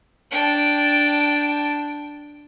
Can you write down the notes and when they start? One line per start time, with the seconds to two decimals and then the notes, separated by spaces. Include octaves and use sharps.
0.31 D4 G5